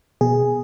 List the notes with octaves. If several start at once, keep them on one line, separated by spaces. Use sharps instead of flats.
B2 G#4